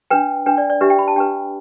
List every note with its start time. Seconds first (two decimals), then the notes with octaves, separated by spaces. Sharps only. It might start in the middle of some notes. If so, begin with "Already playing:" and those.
0.11 D4 B4 G5
0.46 D4 B4 G5
0.58 D5
0.70 D5
0.81 D4 G4 B4 E5
0.90 G5
0.99 B5
1.08 A5
1.16 D4 G4 B4 G5